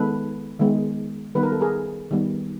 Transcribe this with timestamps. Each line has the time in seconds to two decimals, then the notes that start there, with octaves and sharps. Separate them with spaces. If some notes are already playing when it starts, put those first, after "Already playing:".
Already playing: D#3 G#3 B3 A4 B4
0.60 D#3 G#3 B3
1.35 D#3 G3 B3 B4
1.43 A#4
1.52 A4
1.61 G#4 A#4
2.11 D#3 G3 B3